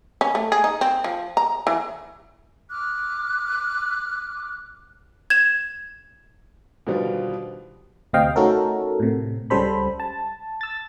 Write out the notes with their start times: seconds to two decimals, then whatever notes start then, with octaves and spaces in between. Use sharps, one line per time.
0.21 C#4
0.35 A3
0.52 G#4
0.64 D#4
0.81 C4
1.04 F3
1.37 A#5
1.67 E3
2.70 D6 F6 F#6
5.30 G#6 E7
6.87 B2 D3 D#3 F3 G3
8.13 D2 C3 C4 D#5 F5 G5
8.36 A3 C#4 D#4 F#4 A4 A#4
9.00 A2 C3
9.50 C#2 C#3 G3 A4 C5 B5
10.00 A5
10.61 E6 A6